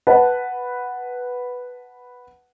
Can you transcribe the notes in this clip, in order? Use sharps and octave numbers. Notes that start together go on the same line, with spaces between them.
B4 F#5 A5